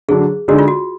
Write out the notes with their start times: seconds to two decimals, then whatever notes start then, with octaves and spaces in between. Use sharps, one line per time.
0.08 D3 F#3 D4 G#4
0.48 D3 G#3 D#4 F#4 G#4 D5
0.59 F4
0.68 F#4